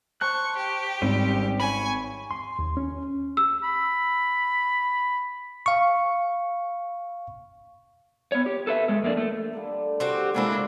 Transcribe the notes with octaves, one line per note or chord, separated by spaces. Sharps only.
C5 A5 C#6 F#6
G4
G#1 G3 C4 C#4
C#5 G#5 B5
C6
D#2
C#4
E6
B5
F5 C#6
B3 C#5
G4
A4 B4 E5
G#3 A4
F2 A#3 D4
A3
D3 G3 A#3
C4 F#4 G4
C#3 G#3 A#3 C4 D4 E4 G#5